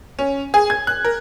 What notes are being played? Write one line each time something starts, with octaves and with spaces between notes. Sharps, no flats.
C#4
G#4
G#6
F#6
A#4